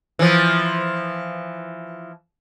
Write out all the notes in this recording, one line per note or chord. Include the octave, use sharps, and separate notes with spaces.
E3 F3